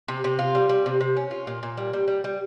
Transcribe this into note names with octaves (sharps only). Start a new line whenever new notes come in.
C3
C3
F4
G3
G3
C3
C3
C#4
F4
A#2
A#2
G3
G3
G3
G3